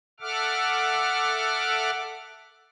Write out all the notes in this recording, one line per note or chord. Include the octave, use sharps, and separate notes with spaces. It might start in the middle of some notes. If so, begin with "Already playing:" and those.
A4 E5 F#5 D6 F6